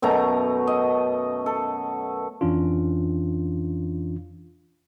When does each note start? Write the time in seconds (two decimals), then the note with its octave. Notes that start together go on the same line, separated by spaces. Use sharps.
0.02 F#2 B2 A3 A#5
0.67 D#5
1.46 A4
2.41 F2 E3 C#4 D4 F4